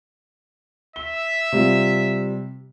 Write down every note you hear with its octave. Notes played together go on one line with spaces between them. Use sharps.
E5 G7
C3 G3 F4